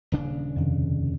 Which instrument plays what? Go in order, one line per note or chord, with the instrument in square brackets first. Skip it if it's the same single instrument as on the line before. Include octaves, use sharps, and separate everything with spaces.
[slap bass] D#1 C#3 D4
[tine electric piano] F2 C3 D#3